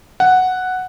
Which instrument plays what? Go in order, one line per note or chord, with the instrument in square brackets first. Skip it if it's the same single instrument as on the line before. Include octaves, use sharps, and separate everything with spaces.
[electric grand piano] F#5